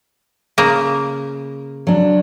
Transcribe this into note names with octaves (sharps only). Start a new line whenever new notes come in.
C#3 A#3
F#3 D4